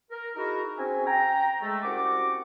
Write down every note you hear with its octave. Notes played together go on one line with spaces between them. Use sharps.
A#4
D#4 E4 F#4 G#4 A#4
C4 C#4 F#4 G#4 E5 G#5
G5 A#5
G#3 A3
C2 C#4 F#4 F#5 D6